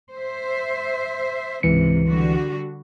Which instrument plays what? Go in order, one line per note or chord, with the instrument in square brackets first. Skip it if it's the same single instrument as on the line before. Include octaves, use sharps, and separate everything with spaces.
[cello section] C5 E5
[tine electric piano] C#2 E3 C#7 [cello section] G#2 C3
[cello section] D3 G3 F#4